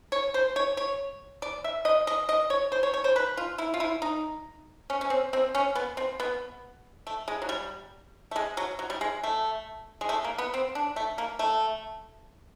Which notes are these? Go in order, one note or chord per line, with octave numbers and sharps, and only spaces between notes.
C#5
C5
C#5
C#5
D5
E5
D#5
D#5
D#5
C#5
C5
C#5
C#5
C5
B4
F4
E4
F4
E4
D#4
C#4
C#4
C4
C4
C#4
B3
C4
B3
A3
G#3
F#3
G3
A3
G#3
F#3
F#3
G3
G#3
A3
G#3
A3
A#3
B3
C4
D4
A3
A#3
A3